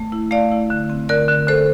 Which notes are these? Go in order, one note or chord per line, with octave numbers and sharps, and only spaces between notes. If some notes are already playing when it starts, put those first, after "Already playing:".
Already playing: A3
E4
A3 D5 F5
E4
D3
C4
D3 A#4 D5
D3
D3 A4 C5